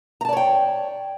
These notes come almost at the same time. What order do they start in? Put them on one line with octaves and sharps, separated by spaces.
A#5 A5 D5 C#5 G5